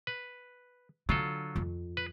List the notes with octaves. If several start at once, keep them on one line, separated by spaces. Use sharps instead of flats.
B4
D3 F#3 F4 A4
F2
B4